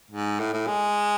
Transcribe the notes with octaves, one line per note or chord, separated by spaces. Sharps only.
G#2
A2
A2
G#3